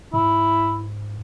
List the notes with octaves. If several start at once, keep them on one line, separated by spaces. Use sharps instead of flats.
G#2 E4